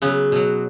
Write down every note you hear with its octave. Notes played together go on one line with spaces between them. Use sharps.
C#3 F#3 B3
B2 F#3